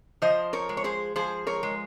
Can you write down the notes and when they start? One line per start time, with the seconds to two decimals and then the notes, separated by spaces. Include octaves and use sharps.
0.22 F3 C5 D#5
0.53 A#4 C#5
0.69 G#3
0.77 C#5
0.84 G#4 C5
1.16 F3 G#4 C5
1.47 A#4 C#5
1.63 G#3